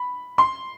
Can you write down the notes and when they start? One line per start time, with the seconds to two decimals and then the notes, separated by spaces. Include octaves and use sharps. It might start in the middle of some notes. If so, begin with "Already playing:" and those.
Already playing: B5
0.38 C6